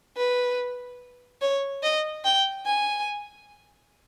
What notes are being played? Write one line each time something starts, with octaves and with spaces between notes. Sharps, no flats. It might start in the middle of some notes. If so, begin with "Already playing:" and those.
B4
C#5
D#5
G5
G#5